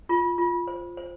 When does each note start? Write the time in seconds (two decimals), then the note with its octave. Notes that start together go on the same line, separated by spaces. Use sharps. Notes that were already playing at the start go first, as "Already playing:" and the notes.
0.09 F4
0.38 F4
0.67 C5
0.97 C5